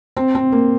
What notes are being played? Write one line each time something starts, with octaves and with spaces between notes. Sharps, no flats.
C4
C4
A#3